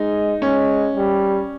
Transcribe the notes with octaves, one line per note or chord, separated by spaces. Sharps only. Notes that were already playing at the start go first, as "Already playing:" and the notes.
Already playing: G#3 D#4
G#3 C#4
G3